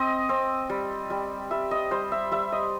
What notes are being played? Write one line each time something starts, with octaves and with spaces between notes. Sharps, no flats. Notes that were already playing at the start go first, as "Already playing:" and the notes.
Already playing: C4 D#5
C4
G3
G3
G3 E5
D#5
G3 C5
E5
G3 E5
D#5